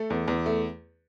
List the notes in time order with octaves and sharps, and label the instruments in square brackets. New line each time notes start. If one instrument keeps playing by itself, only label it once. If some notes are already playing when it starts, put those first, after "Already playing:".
Already playing: [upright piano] A3 A4
E2
E2
A3